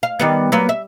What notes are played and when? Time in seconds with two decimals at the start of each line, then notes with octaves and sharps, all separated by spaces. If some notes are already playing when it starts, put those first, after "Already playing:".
0.03 F5
0.19 D#3 G3 B3
0.52 F#3 A#3 B3
0.69 E5